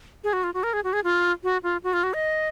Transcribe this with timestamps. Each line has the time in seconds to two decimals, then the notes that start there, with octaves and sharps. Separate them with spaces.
0.24 G#4
0.33 F#4
0.43 F4
0.54 F#4
0.63 A#4
0.73 G#4
0.84 F#4
0.93 G#4
1.04 F4
1.44 F#4
1.63 F4
1.84 F#4
1.93 F4
2.03 F#4
2.14 D#5